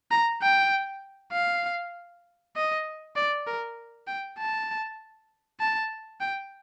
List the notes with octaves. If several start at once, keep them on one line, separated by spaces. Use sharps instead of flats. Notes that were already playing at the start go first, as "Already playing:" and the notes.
A#5
G5
F5
D#5
D5
A#4
G5
A5
A5
G5